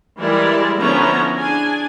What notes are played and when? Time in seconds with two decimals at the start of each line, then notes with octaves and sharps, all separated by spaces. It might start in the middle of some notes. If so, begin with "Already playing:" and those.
0.19 E3 G3 G#3 E4 A#4 D5
0.79 D3 F3 B3 C#4 E4 A#5
1.38 D4 G#4 G#5